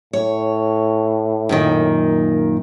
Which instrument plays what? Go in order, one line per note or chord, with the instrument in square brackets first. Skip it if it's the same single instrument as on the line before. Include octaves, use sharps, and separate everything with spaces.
[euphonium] A2 [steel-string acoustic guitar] C#5
[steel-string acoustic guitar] F#2 A#2 D#3